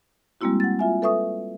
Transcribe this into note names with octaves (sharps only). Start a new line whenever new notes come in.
G3 G#3 A#3 C4 E4 F#4
F#5 A6
F4 E5 G#5
A4 B4 E5 C#6 D#6